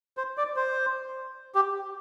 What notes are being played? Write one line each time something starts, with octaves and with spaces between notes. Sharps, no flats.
C5
D5
C5
G4